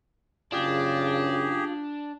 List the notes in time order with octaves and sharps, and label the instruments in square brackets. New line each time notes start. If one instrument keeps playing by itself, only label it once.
[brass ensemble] F#1 C#3 [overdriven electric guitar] D4 [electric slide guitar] F4 [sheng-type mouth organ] G4 G#4